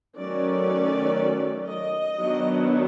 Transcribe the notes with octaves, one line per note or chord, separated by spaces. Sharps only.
D#3 F#3 A3 C#4 D5
D#5
D#3 F#3 B3 D4